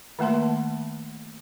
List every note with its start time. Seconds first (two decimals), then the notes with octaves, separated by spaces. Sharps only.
0.19 D#3 A3 A#3 A5 C6